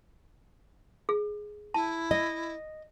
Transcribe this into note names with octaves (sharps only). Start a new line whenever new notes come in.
G#4
E4 A5
D#5